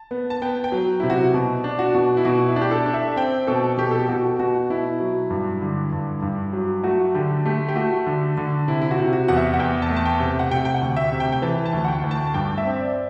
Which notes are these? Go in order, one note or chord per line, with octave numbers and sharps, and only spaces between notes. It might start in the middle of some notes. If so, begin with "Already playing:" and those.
Already playing: A5
B3
A5
B3 G5
G5
F#3
C3 E4
F#4
B2
D4
F#4
B2
E4
B2 F#4
E4
D4
G4
A4
D4
E5
C4 G5
B2 A4
B2 G4
A4
G4
B2 F#4
B2 F#4
B2 E4
F#3
G2
D3
G2
G2
F#3
A3 F#4
D3 G4
A3 G4
G4
A3 F#4
D3
D3
C3 E4
E4
F#4
C3
F#4
E2 F#5
E5
F#5
E2 G5
A5
A3
A5
G5
C3
F#5
C3 G5
G5
F#5
D2
E5
C3
G5
G5
E3 A5
A5
D2
F#5
G5
D2
A5
A5
G2 G5
E5
C4
D5